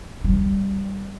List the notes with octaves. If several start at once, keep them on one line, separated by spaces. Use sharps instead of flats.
G3